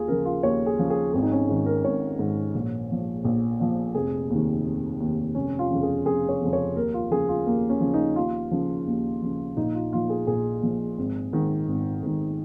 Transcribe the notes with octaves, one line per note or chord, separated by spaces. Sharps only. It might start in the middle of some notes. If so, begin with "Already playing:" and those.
Already playing: D#2 F4 G#4
C#3 F3 A#4
F4
D#2 C#5
G#4
C#3 F3
G#4
G#1 G#4
D#4
C#4
G#2 D#3
A#4
G#1 C#5
G#2 D#3
A#1
A#2 F3
A#1
A#2 F3
F1 G#4
D#2 D#3
F1
D#2 D#3
F1 C#4
F4
F2 C#3 F3
G#4
F1 G#4
C#5
F2 C#3 F3
C#5
D#2 A#4
F4
C#3 F3 G#4
F4
D#2 A#3
C#4
C#3 F3
D#4
D#2 F4
C#3 F3
D#2
C#3 F3
A#1 D#4
F4
A#2 F3 F4
G#4
A#1 G#4
A#2 F3
G#1
G#2 D#3
G#1
G#2 D#3